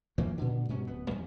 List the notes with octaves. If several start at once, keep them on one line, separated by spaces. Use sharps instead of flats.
F2 E3 F#3 A#3
A#2 D3
G2 B2 C#4
D1 B3
A1 F2